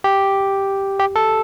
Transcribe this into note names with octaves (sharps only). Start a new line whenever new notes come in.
G4
G4
A4